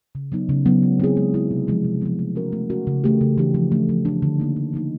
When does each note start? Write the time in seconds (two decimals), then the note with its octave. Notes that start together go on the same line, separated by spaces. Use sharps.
0.15 C#3
0.32 F#3 B3 D#4
0.49 C#3
0.66 F#3 B3 D#4
0.83 G#3
1.00 C4 E4 G#4
1.17 G#3
1.34 C4 E4 G#4
1.51 C3
1.68 F3 G#3 B3
1.84 C3
2.02 F3 G#3 B3
2.19 A3
2.35 C#4 F#4 A#4
2.52 A3
2.70 C#4 F#4 A#4
2.87 C#3
3.04 E3 A3 D4 G4
3.21 C#3
3.38 E3 A3 D4 G4
3.54 F3
3.72 A3 D4
3.89 F3
4.05 A3 D4
4.22 D3
4.40 F3 A#3 D#4
4.57 D3
4.73 F3 A#3 D#4